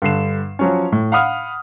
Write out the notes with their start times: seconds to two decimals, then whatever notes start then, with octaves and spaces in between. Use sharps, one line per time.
0.02 G2 D3 C7 E7
0.59 F3 F#3 C#4
0.92 A2
1.12 F5 F#5 B5 D#6 F6